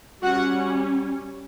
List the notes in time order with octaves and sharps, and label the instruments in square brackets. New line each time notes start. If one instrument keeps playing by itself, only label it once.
[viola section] G3 C#4 F#4 F#5